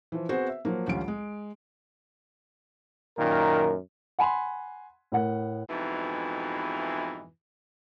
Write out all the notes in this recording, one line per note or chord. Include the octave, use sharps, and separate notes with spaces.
E3 F3
B3 C4 F#4 G#4 C5
E5
F3 F#3 A#3
A1 D2 G3 C#4 F4 D7
G#3
F#2 A#2 D#3 A#4
F#5 G#5 B5 C6
A2 A#4 F#5
F2 G#2 B2 E3